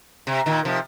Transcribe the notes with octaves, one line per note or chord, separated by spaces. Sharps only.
C3
A#2 D#3
C3 F3